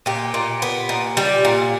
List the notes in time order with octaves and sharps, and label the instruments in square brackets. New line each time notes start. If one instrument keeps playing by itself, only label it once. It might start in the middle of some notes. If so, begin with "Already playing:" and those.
[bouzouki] A#2 G4
A#2
B3
A#2
G3
A#2